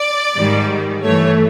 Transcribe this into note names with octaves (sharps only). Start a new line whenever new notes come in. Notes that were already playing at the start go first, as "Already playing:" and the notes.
Already playing: D5
G#2 D#3 G3
G2 E3 A3 C#5